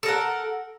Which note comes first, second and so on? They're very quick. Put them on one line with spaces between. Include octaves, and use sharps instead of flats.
A4 A#4 F#5